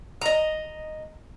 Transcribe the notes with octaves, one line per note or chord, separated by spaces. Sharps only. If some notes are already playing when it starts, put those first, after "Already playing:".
D#5 A#5